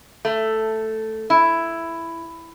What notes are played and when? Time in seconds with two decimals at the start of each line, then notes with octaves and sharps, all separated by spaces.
0.25 A3
1.30 E4